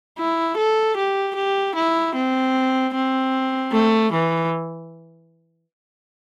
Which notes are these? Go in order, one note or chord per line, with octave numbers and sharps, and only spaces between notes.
E4
A4
G4
G4
E4
C4
C4
A3
E3